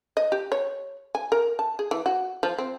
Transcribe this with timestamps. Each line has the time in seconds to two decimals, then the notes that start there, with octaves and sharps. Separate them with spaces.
0.17 D#5
0.32 G4
0.52 C#5
1.15 G#5
1.32 A#4
1.59 A5
1.79 G#4
1.91 E3
2.06 F#4
2.43 F3
2.58 C4